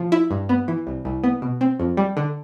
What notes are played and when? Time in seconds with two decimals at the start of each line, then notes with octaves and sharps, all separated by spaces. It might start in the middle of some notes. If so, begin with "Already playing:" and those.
Already playing: F3
0.12 E4
0.31 G2
0.49 B3
0.68 E3
0.87 C2
1.05 C2
1.24 B3
1.42 B2
1.61 C4
1.80 F2
1.97 G3
2.17 D3